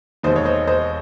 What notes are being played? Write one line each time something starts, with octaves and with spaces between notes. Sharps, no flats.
E1 D#2 D#3 C5 D#5
C#5
C5 D#5
C5 D#5